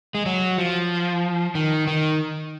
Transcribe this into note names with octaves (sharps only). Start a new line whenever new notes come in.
G#3
F#3
F3
D#3
D#3